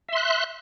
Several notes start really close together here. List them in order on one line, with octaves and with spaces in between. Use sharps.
E5 C6 F#6